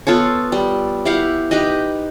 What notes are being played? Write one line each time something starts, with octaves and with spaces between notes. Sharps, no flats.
B3 F4 A4 C#5
G3
E4 G4 F5 F#5
D#4 G4 B4 D#5